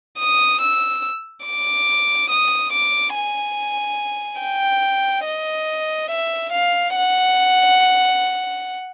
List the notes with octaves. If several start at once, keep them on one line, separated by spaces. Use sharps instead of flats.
D#6
E6
D6
D#6
D6
G#5
G5
D#5
E5
F5
F#5